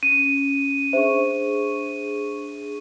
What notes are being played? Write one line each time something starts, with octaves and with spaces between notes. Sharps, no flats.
C#4 D#7
D4 G#4 C5 E5 C#6